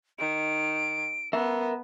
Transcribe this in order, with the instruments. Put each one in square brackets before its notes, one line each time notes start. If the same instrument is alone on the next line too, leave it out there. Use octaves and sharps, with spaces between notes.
[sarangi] D#3 [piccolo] D7
[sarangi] B3 [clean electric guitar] A#4 E5